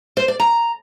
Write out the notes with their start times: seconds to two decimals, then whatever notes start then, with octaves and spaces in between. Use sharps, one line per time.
0.17 C5
0.28 D5
0.40 A#5